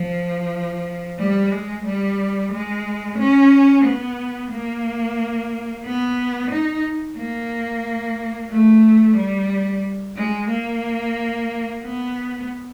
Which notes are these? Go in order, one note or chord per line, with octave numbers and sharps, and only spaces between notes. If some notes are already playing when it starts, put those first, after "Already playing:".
Already playing: F3
G3
G#3
G3
G#3
C#4
B3
A#3
B3
D#4
A#3
A3
G3
G#3
A#3
B3